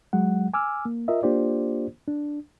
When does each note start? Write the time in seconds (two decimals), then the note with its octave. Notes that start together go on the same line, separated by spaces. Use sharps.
0.13 F#3 G#3 F#5
0.54 G#5 D6 E6 F6
0.85 A#3
1.08 F4 A#4 D#5 E5
1.23 A#3 D4 F4 G4 C5 D5
2.08 D4